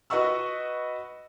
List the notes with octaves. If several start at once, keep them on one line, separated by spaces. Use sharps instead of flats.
F#4 B4 D#5 F#5 C#6 E6